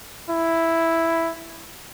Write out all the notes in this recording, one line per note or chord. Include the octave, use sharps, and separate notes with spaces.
E4